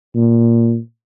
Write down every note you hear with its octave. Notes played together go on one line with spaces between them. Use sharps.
A#2